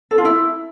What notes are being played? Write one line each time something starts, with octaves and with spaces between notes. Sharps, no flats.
A4
F4
E4